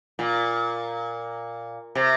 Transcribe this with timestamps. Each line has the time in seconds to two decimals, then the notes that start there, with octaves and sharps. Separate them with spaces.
0.19 A#2
1.95 C3